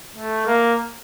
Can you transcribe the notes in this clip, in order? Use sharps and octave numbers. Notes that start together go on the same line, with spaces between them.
A3
A#3